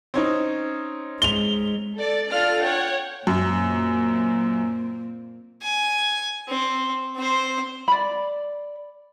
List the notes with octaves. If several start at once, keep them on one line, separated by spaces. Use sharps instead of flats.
C4 C#4 D#4
G#3 F7 G7
A4 D5
D4 F4 A4 D5 F6 A6
C#5 F#5 G5
F#2 A#2 A#3 C4
G#5
C4
C4 C5
D5 B5